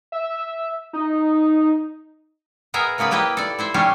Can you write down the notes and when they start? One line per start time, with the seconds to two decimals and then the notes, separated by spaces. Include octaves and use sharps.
0.12 E5
0.93 D#4
2.74 B3 G#4 A#4 E5
2.98 C#3 A#3 B3 B4 D5
3.11 A#3 E4 G4 B4 D#5 G5
3.37 A4 D5
3.59 E4 C5 E5
3.74 G3 A3 C#4 G4 F5 G5